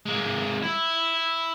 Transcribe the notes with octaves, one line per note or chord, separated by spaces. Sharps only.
G#3 A#3
E4